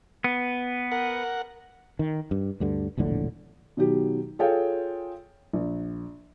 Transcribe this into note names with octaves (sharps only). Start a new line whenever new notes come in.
B3
A#4 F#5
D#3
G2
D2 G2 D3
E1 A#1 A2 D3
B2 D#3 F#3 G4
F4 G#4 A4 C#5 F5 G5
A#1